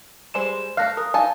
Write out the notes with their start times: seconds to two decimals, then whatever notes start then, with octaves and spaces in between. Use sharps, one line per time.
0.34 G3 G#3 C5 E7
0.77 A3 F5 F6 F#6 A#6
0.97 A#4 D#6
1.14 D#4 F5 G#5 A5